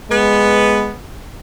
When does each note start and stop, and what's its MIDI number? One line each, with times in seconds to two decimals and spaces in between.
0.11 0.92 56
0.11 0.98 59
0.11 0.98 71